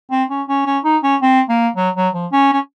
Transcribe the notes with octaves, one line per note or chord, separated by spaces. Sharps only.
C4
C#4
C#4
C#4
D#4
C#4
C4
A#3
F#3
F#3
F3
C#4
C#4